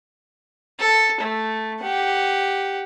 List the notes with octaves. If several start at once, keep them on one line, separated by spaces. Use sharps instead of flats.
A4
A3
G4 F#5